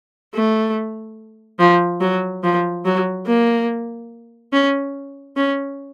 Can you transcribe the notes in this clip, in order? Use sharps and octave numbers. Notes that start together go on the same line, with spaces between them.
A3
F3
F#3
F3
F#3
A#3
C#4
C#4